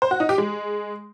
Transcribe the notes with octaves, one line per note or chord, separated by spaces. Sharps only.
C5
F#4
D#4
G4
G#3